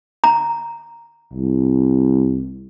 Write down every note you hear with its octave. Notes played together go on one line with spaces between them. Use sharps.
A#5
C2